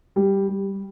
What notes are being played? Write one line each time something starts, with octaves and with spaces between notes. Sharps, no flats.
G3
G3